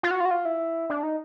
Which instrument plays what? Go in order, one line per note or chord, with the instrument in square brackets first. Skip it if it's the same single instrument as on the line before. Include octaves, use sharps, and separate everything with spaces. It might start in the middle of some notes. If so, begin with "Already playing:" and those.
[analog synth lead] F4
F#4
F4
F#4
F4
E4
D4
D#4